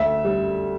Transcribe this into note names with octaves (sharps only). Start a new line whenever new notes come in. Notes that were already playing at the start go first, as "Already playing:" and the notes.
Already playing: D2 E5
G3